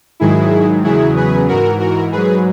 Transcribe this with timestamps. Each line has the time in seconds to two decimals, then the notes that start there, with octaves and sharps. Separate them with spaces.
0.20 G#2 D#3 F#3 E4 G#4
0.84 E2 C#3 F#3 E4 G#4
1.16 G#4 B4
1.48 G#2 E3 F#4 A#4
1.79 F#4 A#4
2.12 G#2 F#3 G#4 B4